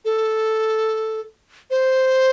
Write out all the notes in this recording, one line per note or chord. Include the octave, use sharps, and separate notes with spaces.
A4
C5